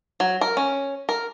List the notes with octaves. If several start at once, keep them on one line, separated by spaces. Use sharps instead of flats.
F#3
A#4
C#4
A#4